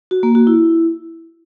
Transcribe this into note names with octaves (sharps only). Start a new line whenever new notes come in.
F#4
A#3
F#4
E4